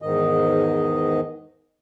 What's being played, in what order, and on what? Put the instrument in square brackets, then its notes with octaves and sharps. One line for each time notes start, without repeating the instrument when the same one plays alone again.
[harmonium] E2 G#2 D#3 D#5